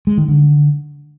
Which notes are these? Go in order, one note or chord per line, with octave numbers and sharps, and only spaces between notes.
G#3
D#3
D3